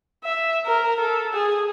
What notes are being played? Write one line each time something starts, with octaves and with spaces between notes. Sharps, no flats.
E5
A#4
A4
G#4